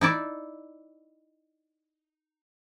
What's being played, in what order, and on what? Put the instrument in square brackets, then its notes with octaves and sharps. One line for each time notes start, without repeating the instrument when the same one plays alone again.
[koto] D#4 E4 D5